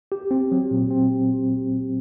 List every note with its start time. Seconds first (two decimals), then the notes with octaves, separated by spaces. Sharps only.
0.12 G4
0.31 C4
0.52 F#3
0.71 A#2
0.91 C4